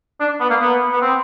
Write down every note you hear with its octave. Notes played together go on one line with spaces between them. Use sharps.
D4
B3
A#3
B3
B3
C4